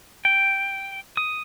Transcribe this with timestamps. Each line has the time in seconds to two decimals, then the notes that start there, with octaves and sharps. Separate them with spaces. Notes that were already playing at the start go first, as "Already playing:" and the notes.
0.25 G5
1.17 D#6